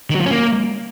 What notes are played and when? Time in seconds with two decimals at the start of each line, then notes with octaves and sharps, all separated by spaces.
0.10 D#3
0.15 F#3
0.21 F3
0.26 C#4
0.31 A#3